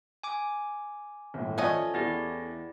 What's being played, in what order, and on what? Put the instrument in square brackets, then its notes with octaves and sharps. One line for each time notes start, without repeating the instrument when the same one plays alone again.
[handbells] G#5 D6
[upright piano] G1 A2
[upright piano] F3 D5 G#6 [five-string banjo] A3 C#4 D#5
[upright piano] E2 F#5 A#6 [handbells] E4 G4 D5